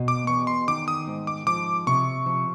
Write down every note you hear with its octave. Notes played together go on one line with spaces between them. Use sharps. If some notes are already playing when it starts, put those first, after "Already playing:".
Already playing: B2
D6
E2 C#6
C6
D#3 D6
D#6
G#2
D6
F3 D6
C3 C#6
F3